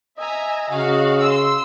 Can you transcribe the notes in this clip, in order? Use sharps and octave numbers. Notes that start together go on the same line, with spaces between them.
D#5 E5 G#5 A#5
C#3 F#4 F5
C6 E6